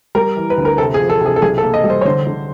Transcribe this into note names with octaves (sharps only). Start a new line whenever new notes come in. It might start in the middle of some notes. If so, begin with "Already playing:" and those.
G3 A#4
E3
B4
D2
A#4
C3 A4
G#4
F3
A4
C3 G#4
A4
B1 G#4
A4
A#3
D#5
G3
C5
C#5
D3 C5
D3